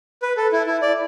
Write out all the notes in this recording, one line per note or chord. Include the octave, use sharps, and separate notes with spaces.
B4
A4
E4
E4
D5